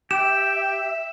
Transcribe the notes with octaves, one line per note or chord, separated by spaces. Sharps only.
G4 E5 G5 E7